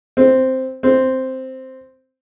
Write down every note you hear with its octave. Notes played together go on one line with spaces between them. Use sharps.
C4
C4